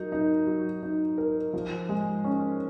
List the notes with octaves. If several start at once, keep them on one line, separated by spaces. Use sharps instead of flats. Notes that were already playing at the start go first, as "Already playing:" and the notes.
Already playing: F#3 D#4 A#4
D#4
F#3
D#4
A#4
F3
G#3
C#4